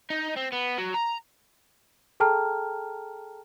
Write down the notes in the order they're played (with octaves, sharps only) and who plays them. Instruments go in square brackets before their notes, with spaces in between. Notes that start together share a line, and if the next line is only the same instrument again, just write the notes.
[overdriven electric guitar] D#4
C4
B3
F#3
A#5
[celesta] G#4 A4 G5 A5 A#5 F6